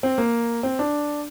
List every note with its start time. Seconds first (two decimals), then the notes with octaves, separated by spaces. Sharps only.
0.03 C4
0.18 A#3
0.63 C4
0.79 D4